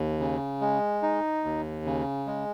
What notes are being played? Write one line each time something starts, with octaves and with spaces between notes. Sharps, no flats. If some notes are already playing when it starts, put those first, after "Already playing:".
Already playing: D#2
C#3
G#3
D#4
D#2
C#3
G#3